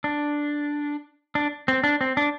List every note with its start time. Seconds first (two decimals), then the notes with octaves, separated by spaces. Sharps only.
0.04 D4
1.35 D4
1.68 C4
1.84 D4
2.01 C4
2.17 D4